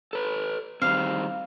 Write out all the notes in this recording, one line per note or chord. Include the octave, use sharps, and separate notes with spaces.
A4 B4
D#3 G3 C4 F5